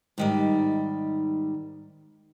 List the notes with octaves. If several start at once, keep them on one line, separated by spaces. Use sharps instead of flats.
G#2 D#3 G3